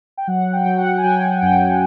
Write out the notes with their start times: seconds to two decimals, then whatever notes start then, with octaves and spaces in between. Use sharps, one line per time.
0.18 G5
0.27 F#3 F#5
0.53 G5
0.66 F#3
0.78 F#5
0.98 G#5
1.03 F#3 G5
1.41 F#2 G5